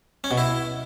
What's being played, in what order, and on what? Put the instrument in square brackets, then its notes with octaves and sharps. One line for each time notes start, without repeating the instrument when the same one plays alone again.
[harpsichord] C#4
B2
E4